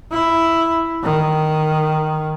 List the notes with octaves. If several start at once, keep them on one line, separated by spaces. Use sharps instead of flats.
E4
D#3